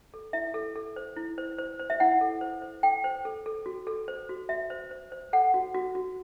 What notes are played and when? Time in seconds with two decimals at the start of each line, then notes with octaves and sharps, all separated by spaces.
0.14 A4
0.33 E4 E5
0.54 A4
0.76 A4
0.96 C5
1.16 E4
1.38 C5
1.58 C5
1.80 C5
1.90 E5
2.00 E4 F#5
2.21 A4
2.41 C5
2.62 C5
2.83 A4 G5
3.04 C5
3.25 A4
3.46 A4
3.66 F#4
3.87 A4
4.08 C5
4.29 F#4
4.49 F#4 E5
4.70 C5
4.91 C5
5.12 C5
5.33 A4 F#5
5.54 F#4
5.75 F#4
5.95 F#4